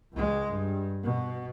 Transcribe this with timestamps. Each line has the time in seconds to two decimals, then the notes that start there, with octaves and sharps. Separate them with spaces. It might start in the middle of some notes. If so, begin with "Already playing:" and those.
0.13 C#2 G#3
0.49 G2
1.03 B2